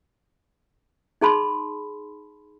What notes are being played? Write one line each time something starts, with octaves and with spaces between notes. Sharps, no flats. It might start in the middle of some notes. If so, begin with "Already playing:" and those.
D#4 G#4 A5 B5 C6